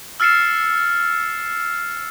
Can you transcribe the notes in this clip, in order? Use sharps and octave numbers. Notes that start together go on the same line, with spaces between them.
E6 F6 A6 C7 C#7 E7